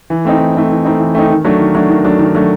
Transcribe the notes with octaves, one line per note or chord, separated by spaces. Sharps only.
E3
A3 C4 D#4
E3
A3 C4 D#4
E3
A3 C4 D#4
E3
A3 C4 D#4
D#3
F#3 A3 D4
D#3
F#3 A3 D4
D#3
F#3 A3 D4
D#3
F#3 A3 D4